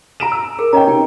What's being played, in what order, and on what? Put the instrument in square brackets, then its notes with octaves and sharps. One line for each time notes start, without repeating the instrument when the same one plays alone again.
[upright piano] A#5 D7 E7
E6
[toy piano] G#4 A#4
[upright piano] C#4 G5 [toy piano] B4 D#5 A#5
[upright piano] C3 [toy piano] D#4 G5